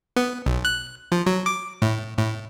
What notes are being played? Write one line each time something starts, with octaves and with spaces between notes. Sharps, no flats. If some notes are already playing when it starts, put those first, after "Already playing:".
B3
B1
F#6
F3
F#3
D6
A2
A2